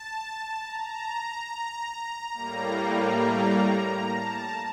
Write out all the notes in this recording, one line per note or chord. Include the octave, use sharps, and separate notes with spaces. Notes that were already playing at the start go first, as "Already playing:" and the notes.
Already playing: A5
A#5
A2 G3 A#3
A5